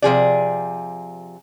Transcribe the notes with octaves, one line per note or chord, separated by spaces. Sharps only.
C3 F3 G#4 D5